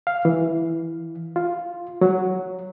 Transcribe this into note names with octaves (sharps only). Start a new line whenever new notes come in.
F5
E3
F4
F#3